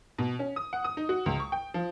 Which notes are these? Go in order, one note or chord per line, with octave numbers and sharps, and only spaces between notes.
B2
C#4
D#6
F#5
D#6
D#4
F#4
C#2
C#6
G5
F3